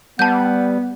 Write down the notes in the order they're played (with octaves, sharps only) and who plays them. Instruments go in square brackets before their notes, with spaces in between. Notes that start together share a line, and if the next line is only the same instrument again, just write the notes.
[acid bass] G3 [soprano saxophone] B3 [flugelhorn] F#5 [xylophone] A5 G6